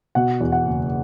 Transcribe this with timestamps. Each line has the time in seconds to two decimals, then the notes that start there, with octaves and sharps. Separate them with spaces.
0.15 B2 F#5
0.40 E2
0.52 F#5
0.65 F#1